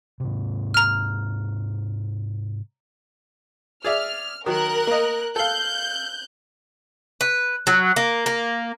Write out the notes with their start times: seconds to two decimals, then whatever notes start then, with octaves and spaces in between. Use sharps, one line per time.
0.20 G#2 C3
0.74 A#5 F6
3.84 G#4 D5 E5 F6
4.46 D#3 F#3 A#4 F#6
4.87 A#3 D#5
5.36 A4 F5 F#6 G6
7.21 B4
7.67 F#3
7.96 A#3
8.26 A#3